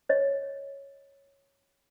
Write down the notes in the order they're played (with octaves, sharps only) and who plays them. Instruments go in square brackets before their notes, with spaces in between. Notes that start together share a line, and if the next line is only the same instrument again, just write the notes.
[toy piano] C#5 D#5